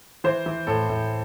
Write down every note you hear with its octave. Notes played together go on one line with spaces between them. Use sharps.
E3 C5
E3
A2 A4
A2